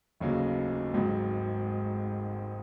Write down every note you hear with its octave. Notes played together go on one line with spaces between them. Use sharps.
F1 D#2 C#3 F#3
G#1 G#2 F#3